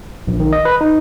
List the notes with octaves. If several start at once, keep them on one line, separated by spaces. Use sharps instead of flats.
A#1
D#3
D#5
B4
D#4